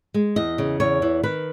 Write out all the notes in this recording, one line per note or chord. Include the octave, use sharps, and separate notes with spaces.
G#3
E2 D#5
C#3
E2 C#5
E3
D#3 B4